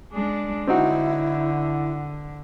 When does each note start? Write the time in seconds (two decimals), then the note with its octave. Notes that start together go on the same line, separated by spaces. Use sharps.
0.13 G#3 D4
0.67 D3 C4 D#4 E4 F#4